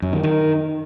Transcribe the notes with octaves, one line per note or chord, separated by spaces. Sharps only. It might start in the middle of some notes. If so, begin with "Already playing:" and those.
F#2
D#3
D#3